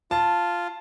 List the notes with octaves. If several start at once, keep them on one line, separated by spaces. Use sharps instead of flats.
F4 A5